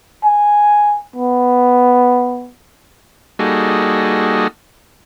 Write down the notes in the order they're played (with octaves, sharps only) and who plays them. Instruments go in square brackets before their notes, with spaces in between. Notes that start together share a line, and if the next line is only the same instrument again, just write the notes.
[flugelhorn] G#5
B3
[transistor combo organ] G3 A#3 D#4 F#4 G#4 A4